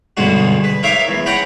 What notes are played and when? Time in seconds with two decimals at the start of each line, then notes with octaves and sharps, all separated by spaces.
0.17 B1 G2 B2 D3 G#3 F#4
0.64 B4
0.83 D#4 A#4 C#5 E5 F5 D6
1.08 E2
1.26 C#4 B4 F#5 G5 A#5 B5